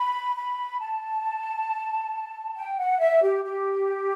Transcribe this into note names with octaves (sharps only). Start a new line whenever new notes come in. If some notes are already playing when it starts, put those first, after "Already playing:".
Already playing: B5
B5
A5
G5
F#5
E5
G4
G4